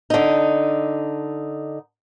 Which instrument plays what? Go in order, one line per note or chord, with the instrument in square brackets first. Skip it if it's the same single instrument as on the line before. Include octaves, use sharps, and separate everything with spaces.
[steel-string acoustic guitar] D3 D#4